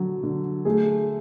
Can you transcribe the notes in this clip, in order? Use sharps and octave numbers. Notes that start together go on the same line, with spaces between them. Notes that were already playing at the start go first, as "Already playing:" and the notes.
Already playing: D3 F#3
D3
A3 G#4